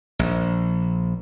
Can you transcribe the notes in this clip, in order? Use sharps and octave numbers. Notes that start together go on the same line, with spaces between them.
A#1